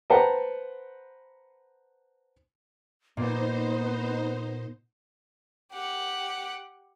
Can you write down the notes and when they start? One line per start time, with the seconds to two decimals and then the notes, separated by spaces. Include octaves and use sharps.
0.10 B4 C5 F#5 G5 A5 A#5
3.17 A#2 A#3 B3 D#4 C5
5.73 G4 F#5